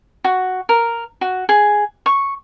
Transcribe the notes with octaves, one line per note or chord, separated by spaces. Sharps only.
F#4
A#4
F#4
G#4
C#6